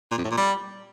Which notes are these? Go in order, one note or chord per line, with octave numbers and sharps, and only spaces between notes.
A#2
F2
A2
A#2
G3